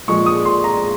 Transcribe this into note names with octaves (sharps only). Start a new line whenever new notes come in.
A#2 F3 G#3 C#6
D#6
C6
A#5